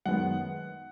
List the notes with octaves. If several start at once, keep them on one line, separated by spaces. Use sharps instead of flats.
F#2 D#3 G#3 B3 F#5